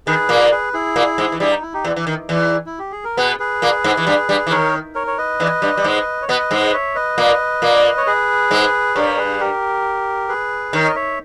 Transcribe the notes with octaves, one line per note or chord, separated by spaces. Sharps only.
D#3 G#4 B4
A#2 A#3
G#4 B4
E4 G#4
A#2 A#3
G#2 G#3
E3
G2 G3 E4 G#4
D#4
E4
D#4 G4
E2 E3
E3
D#3
E2 E3
E4
G4
G#4
A#4
B2 B3 G#4 B4
G#4 B4
A#2 A#3
G#2 G#3
E3
G2 G3
G2 G3
E3
D#3 A#4 C#5
A#4 C#5
C#5
B4 D#5
E2 E3
G2 G3
G3
G#2 G#3
C#5
B2 B3 B4 D#5
G#2 G#3
C#5 E5
B4 D#5
A#2 A#3
A#2 A#3
C#5
G#4 B4
G#2 G#3
G2 G3 A#4 C#5
G#4 B4
G4 A#4
G#4 B4
D#3 A#4 C#5
D#5
C#5 E5